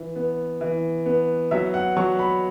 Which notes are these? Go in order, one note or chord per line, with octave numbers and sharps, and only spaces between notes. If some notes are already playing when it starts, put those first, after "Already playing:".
Already playing: E3
B3
E3
B3
F#3 E5
F#5
F#3 C#6
B5